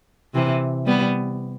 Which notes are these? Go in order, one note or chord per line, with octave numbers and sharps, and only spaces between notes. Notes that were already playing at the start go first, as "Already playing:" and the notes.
C3 E3
G3 B3